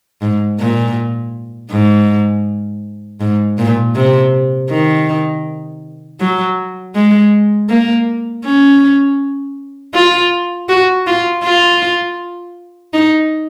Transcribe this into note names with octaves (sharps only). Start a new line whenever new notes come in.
G#2
A#2
G#2
G#2
A#2
C3
D#3
F#3
G#3
A#3
C#4
F4
F#4
F4
F4
D#4